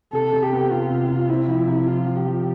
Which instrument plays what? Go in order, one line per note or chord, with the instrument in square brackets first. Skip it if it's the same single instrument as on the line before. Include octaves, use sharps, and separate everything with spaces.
[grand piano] C3 [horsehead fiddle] A4
[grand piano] C3
[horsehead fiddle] G4
[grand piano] B3
[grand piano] C3 [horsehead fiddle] F4
[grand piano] C3
C3
[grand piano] C4 [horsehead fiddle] E4
[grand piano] F3
C3
[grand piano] F3 [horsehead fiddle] F4
[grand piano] F3
[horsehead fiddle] G4
[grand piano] F3